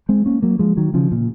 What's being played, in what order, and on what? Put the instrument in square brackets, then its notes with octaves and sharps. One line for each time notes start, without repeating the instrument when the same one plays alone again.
[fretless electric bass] G#3 C4
A#3 C#4
F#3 A#3
F3 G#3
D#3 F#3
C#3 F3
A#2